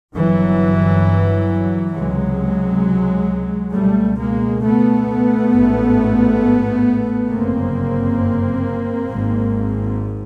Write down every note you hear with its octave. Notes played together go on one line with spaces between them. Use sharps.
G1 G2 E3 F#3
C#2 C3 F#3 G#3
C#2 B2 G3 A3
G#3 A#3
A3 B3
A1 G#2
G1 F#2 C#3 A#3 C4
G#1 G#2